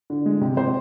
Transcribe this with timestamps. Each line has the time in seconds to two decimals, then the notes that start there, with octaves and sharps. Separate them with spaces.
0.10 D3
0.26 G#3
0.41 C3
0.57 C3 C5